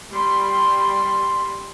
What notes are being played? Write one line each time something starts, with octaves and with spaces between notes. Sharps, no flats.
G3 B5 C6